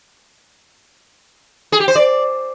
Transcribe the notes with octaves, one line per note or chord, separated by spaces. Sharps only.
G#4
G4
C5
D5